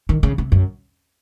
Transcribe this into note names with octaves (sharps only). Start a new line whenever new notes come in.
D#3
C#3
C3
F#2